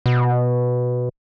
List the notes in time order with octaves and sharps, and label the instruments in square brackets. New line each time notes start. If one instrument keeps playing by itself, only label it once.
[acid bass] B2